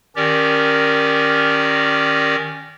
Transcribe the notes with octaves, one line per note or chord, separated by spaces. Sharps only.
D#3 C#4 G4 A#4 D5